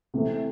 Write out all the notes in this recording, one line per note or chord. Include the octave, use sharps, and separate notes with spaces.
C3 E3 A3